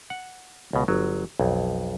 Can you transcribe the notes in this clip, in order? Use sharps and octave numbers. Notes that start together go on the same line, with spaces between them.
F#5
C#2 B2
G1 F#3
B1 F2